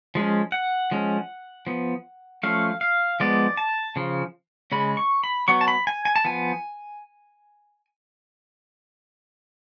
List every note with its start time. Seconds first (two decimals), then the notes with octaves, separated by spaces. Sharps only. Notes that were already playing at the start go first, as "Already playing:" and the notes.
0.15 F3 G#3 C#4
0.52 F#5
0.91 F3 G#3 C#4
1.67 F3 B3
2.43 F3 A3 C#4 F5
2.81 F5
3.20 F3 G#3 B3 D5
3.57 A5
3.96 C#3 F3
4.72 C#3 G#3 C#4 B5
4.97 C#6
5.24 B5
5.48 F#3 B3 C#6
5.61 A5
5.68 B5
5.87 G#5
6.05 G#5
6.16 A5
6.25 F3 B3 G#5